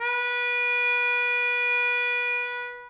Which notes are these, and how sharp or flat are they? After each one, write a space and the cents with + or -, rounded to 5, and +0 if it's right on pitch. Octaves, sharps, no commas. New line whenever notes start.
B4 -20